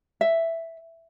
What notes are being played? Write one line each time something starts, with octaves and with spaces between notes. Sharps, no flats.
E5